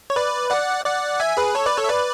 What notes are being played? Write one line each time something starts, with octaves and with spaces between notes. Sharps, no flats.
C#5
B4 D5
D5 F#5
D5 F#5
E5 G#5
G#4 B4
A4 C#5
B4 D5
A4 C#5
E5
B4 D5